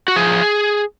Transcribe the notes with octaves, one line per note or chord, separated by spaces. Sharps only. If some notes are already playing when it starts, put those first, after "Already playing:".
F#4
F3 G#4